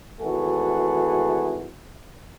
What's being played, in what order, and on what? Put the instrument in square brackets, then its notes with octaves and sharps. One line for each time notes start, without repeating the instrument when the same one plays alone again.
[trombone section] G#1 E3 A3 F#4 G#4